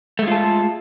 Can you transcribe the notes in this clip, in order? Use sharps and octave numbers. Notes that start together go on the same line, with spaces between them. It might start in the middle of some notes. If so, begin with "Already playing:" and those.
G#3 A3 F4 A4